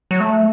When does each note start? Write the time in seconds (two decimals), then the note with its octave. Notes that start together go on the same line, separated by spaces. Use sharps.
0.11 F#3
0.20 A3